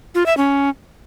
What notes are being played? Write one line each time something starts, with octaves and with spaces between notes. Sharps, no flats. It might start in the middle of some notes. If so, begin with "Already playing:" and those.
F4
E5
C#4